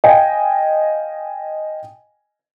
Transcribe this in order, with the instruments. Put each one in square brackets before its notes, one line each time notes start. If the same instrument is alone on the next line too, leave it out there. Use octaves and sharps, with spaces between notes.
[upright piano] D#5 F5 G5 G#5